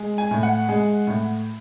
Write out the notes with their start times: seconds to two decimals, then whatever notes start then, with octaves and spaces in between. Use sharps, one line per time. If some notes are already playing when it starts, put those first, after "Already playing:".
Already playing: G#3
0.18 G#5
0.31 A2
0.43 F#5
0.69 G#3
1.07 A2